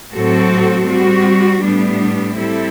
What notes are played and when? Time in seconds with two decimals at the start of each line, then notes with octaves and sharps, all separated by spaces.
0.13 A2 F#3 C4 F#4 A4
0.87 G3 C4 F#4
1.63 A2 G3 B3 D4
2.37 G3 C4 E4 A4